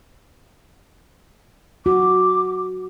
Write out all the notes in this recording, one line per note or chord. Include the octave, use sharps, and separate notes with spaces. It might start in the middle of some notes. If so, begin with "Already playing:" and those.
F#4 D6